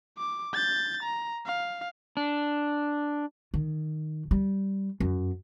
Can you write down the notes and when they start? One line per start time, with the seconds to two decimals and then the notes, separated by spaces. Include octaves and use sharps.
0.18 D6
0.53 G6 A6
1.03 A#5
1.46 F5
2.17 D4
3.54 D#3
4.31 G3
5.00 F#2